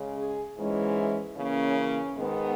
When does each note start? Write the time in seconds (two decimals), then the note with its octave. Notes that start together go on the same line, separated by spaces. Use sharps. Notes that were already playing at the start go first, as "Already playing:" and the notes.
Already playing: C#3 G#3 C#4
0.17 G#4
0.57 G#2 E3 G#3 C#4
0.97 E4
1.37 C#3 E3 A#3 C#4
1.78 C#4
2.17 G#2 D#3 G#3 B3